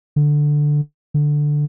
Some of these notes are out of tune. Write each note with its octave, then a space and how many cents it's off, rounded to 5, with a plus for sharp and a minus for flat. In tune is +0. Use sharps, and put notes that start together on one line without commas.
D3 +5
D3 +5